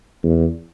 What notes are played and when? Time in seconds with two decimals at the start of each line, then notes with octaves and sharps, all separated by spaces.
0.23 E2